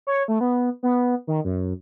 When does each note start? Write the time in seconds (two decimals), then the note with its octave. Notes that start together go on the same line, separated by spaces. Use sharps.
0.07 C#5
0.28 A3
0.41 B3
0.83 B3
1.27 D#3
1.44 F#2